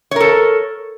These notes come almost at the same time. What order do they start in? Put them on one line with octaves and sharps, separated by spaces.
C#5 A#4 A4